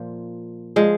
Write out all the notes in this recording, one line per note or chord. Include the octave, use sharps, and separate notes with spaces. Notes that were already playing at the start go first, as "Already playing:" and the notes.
Already playing: A#2 F3
F3 G#3